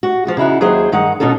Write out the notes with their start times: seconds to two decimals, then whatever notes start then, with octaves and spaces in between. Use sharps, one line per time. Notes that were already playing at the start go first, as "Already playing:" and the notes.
0.03 F#4
0.25 F3 F#4 G#4
0.37 C#3 D#4 E4 F#4
0.61 D#2 F#3 G#4 C5 G5
0.92 G2 D#3 D#4 F#5
1.20 B2 C#4 D#4 F4 A4